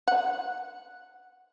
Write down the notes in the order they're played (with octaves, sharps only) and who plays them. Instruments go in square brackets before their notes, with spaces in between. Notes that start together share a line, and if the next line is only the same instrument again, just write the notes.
[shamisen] F#5